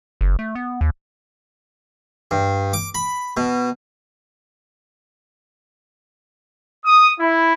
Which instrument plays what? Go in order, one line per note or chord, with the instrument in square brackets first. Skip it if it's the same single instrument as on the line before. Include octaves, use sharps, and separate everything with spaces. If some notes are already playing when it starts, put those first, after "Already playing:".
[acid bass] F#1
A3
B3
D#2
[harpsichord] G2
D6
B5
B2
[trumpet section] D#6
E4